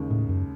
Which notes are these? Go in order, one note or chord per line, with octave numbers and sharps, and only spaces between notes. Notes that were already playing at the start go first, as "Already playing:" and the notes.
Already playing: D#2 C#3 G#3 D#4
A2
F#2